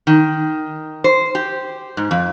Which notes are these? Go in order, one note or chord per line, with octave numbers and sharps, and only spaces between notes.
D#3
C5
G4
G#2
F2